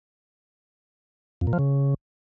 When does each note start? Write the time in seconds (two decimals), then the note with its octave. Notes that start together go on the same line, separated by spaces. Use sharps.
1.41 F2
1.47 A#2
1.53 F3
1.59 C#3